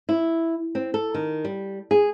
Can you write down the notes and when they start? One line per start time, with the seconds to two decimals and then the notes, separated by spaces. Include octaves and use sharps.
0.09 E4
0.75 C4
0.94 A4
1.14 D#3
1.45 G3
1.91 G#4